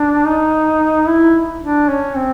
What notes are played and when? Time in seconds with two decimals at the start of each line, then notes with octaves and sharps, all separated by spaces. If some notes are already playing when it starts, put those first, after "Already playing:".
Already playing: D4
0.25 D#4
1.07 E4
1.62 D4
1.88 C#4
2.16 C4